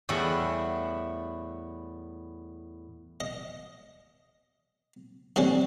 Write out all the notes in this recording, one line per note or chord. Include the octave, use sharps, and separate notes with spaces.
E2 A2 G3 E4 F#5
D#5
D3 G3 C4 C#4